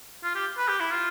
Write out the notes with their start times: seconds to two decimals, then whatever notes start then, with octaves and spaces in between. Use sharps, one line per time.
0.24 F4
0.35 G4
0.58 B4
0.68 G4
0.80 E4
0.91 F4